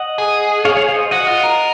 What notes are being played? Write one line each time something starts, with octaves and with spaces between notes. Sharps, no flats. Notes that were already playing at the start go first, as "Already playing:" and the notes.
Already playing: D#5 F#5
G#4
C#5 F5
C#5 F5
C5 D#5
F#4 D#5 F#5
F4
A#4